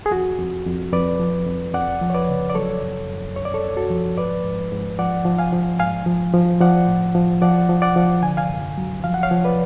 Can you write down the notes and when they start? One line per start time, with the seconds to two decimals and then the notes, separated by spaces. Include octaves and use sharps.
0.06 G#4
0.11 F2 F#4
0.39 F2
0.66 F2
0.93 F2 B4 D5
1.19 F3
1.47 F2
1.74 F2 D5 F#5
2.01 F3
2.10 C#5
2.14 B4 D5
2.29 C#3
2.50 D5
2.55 F#3 A4 C#5
2.82 F#2
3.10 F#2
3.36 F#2 C#5
3.45 D5
3.54 A4 C#5
3.63 F#2
3.77 F#4 A4
3.90 F3
4.17 G#2 B4 D5
4.45 G#2
4.71 G#2
4.99 F3 D5 F#5
5.25 F3
5.38 F5 G#5
5.53 F3
5.79 G#2 F5 G#5
6.06 F3
6.33 F3
6.60 F3 D5 F#5
6.87 A2
7.15 F3
7.42 F3 D5 F#5
7.69 F3
7.82 D5 F#5
7.96 F3
8.22 D3 G#5
8.37 F5 G#5
8.49 F#2
8.78 F#3
9.04 F3 F5
9.14 F#5
9.23 C#5 F5
9.31 F3
9.45 B4 D5